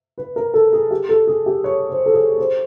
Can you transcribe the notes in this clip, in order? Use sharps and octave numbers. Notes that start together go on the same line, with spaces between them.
B4
A#4
A4
G#4
G4
A4
G#4
G4
C#5
C5
A4
G#4
C5